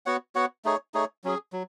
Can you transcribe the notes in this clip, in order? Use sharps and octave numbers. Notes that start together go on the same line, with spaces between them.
B3 F#4 C#5 F#5
B3 F#4 C#5 F#5
A3 D#4 G#4 C#5
A3 D#4 G#4 C#5
F#3 C#4 G#4
F#3